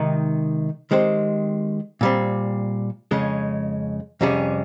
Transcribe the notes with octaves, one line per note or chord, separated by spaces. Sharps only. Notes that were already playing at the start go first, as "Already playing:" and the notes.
Already playing: C3 D#3 G#3 D#4
D#3 G#3 C4 G4 C5
A#2 G3 C4
F2 C#3 G#3 C#4
F2 C3 G3 C#4 G#4